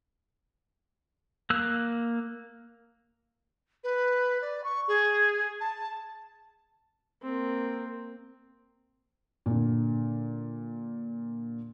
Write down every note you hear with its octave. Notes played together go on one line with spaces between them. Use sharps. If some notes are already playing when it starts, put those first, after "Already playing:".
A#3 E6 F#6
B4
D5
C#6
G#4
A5
A#3 C4
A#2 D3